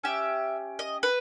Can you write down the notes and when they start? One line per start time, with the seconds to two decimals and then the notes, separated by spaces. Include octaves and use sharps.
0.04 C#4 G4 E5
0.79 D#5
1.03 B4